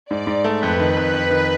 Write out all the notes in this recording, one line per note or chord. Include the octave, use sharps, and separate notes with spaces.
G#2 D5
G#2
A3
F2 B4
D#3
F2
F2
D#3